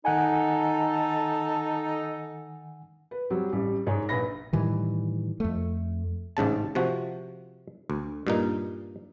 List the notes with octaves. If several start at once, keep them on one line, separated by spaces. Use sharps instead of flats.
D#3 D#4 A4 F#5 G#5
B4
F#3 G3 C4
A1 G3
G#2 G#4 C#5
A#1 B4 B5 A#6
A2 D#3 E3 G3
F2 A3
A1 G#2 C#3 A5
C3 F3 F#4
D2
G2 A#2 D#4